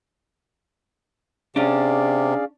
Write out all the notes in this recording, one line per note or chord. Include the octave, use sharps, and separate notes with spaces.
C3 C#4 D4 G#4 D5 F5